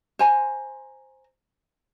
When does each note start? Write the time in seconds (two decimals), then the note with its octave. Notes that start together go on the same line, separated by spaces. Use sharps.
0.19 C5 G#5 A#5